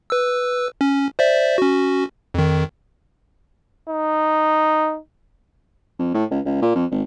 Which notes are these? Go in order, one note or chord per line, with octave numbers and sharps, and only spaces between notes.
B4 E6
C#4
C5 D5 E5
C#4 F#4
F2 D#3
D#4
F2
A2
C#2
C#2
A#2
F2
G#1